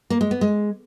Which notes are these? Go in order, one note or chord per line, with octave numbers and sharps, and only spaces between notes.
A#3
G#3
B3
G#3